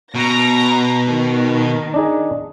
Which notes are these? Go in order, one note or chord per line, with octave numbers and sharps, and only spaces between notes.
B2 A#5 A#6
D#3
D4 D#4 G#4